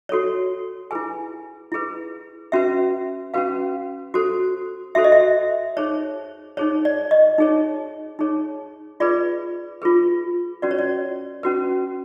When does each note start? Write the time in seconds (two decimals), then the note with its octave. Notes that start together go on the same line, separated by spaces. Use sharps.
0.09 F#4 A4 C#5
0.91 E4 G#4 B4 G#5
1.72 E4 G#4 B4
2.52 C#4 F#4 B4 E5
3.34 C#4 F#4 B4 F5
4.14 F#4 A4 C5
4.95 F#4 A4 C5 E5
5.04 D#5
5.12 E5
5.77 D#4 G#4 C5 C#5
6.57 D#4 G#4 C5 C#5
6.85 D5
7.11 D#5
7.38 D#4 G#4 C#5
8.19 D#4 G#4 C#5
9.00 F4 G#4 B4 D5
9.82 F4 G#4 B4
10.62 C#4 F#4 B4 D5
10.71 C#5
10.79 D5
11.43 C#4 F#4 B4